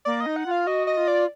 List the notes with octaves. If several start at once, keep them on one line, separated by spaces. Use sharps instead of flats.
A#3 D5
D#5
D#4
F#5
F4
F5
F#4 D#5
D#5
F4
D5